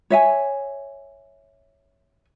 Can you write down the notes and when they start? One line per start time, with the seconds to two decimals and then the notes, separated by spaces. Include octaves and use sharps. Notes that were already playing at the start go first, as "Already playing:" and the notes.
0.10 C#5 E5 G#5